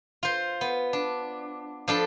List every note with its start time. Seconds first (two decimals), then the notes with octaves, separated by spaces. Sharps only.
0.23 F4 C5
0.61 B3
0.93 D4
1.88 F3 D4 A4 B5